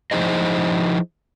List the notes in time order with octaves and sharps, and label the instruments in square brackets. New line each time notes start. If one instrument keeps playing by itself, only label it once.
[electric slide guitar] F3 D#4 E4 G#4 C5 D#5